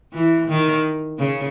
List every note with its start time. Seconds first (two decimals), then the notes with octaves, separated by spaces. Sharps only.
0.13 E3
0.48 D#3
1.19 C#3